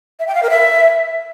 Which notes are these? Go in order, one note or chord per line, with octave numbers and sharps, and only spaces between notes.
E5
G5
F5
A#4
E5